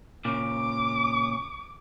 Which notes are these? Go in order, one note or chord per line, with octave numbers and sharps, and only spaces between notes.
A#2 C#3 D6